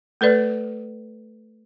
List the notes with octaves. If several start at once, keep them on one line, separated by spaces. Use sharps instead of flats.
A3 A4 B4 D5